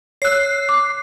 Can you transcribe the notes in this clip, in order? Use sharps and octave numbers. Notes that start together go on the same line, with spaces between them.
C#5 E6 F#6 C7
D6